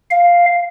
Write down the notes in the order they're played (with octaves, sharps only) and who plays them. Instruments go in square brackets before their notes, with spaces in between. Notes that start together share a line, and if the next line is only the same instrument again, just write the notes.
[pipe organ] F5